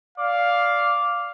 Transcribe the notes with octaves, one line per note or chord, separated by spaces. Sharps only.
D5 F5